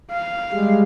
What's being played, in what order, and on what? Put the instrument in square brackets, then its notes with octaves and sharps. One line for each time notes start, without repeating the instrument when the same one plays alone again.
[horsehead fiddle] F5
[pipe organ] G3 G#3